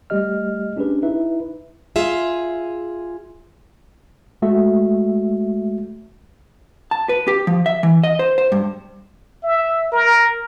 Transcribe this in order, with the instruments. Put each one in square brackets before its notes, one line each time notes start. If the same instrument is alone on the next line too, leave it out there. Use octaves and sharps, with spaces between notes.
[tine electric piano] G3 A3 G4 D#5 F6
C#4 D4 G4 G#4 B4
D#4 E4 B4 E5
[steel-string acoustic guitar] F4 G#4 E5
[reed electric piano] G#3 A3 F#4 E5
[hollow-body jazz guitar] A5
B4
G4
F3
E5
E3
D#5
C5
C5
G2
[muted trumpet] E5
A#4